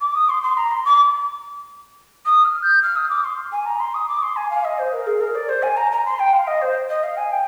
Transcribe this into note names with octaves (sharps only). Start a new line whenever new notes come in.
D6
D#6
C6
C6
A#5
C6
D6
D#6
F6
G6
F6
D#6
D6
C6
G#5
A#5
C6
D#6
D6
C6
G#5
F5
D#5
C5
A#4
G#4
A#4
D5
C5
G#5
A#5
A#5
C6
G5
F5
D#5
C5
D#5
F5
G#5
G5